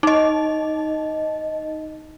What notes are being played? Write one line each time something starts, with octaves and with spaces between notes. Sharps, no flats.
D#4 D#5